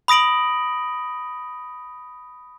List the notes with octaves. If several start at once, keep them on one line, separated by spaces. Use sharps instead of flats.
B5 D#6 A#6 D7 F#7